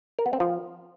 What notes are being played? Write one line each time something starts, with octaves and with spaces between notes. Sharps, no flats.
A#4
B3
C4
F3